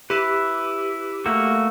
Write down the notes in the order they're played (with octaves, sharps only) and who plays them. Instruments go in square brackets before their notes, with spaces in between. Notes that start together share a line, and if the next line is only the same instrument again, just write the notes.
[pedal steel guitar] E4 B4 [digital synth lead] G4
[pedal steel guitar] A3 A#3 F#4